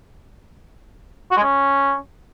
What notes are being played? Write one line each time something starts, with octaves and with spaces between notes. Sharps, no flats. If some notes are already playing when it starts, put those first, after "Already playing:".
F#4
G#3
C#4